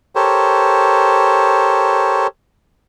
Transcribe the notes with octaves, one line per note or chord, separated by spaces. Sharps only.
G4 A4 A#4 C5 C#5